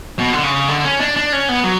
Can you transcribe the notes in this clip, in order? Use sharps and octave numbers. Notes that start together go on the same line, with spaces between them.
B2
D3
C#3
D3
C#4
D4
D4
C#4
B3
F#3